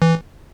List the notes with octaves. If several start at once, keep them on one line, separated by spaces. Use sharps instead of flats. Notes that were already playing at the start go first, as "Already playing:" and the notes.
E3